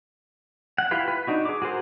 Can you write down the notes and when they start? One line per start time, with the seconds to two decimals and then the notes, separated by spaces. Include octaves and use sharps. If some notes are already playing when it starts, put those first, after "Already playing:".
0.78 F#5
0.91 E4 F4 G4 B4 F5
1.08 B4
1.27 D4 D#4 F#4
1.45 G#4 D6
1.62 F#4 G#4 A#4 C5